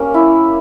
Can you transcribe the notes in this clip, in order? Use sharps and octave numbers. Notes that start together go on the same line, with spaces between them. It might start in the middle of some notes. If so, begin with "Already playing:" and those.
Already playing: A#3 C#4 G4
E4